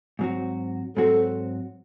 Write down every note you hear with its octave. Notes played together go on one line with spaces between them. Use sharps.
G#2 F#3 C4 F#4
G#2 F#3 C4 F#4 A4